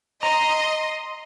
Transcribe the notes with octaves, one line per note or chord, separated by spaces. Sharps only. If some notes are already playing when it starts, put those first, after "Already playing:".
D#5 A#5 C6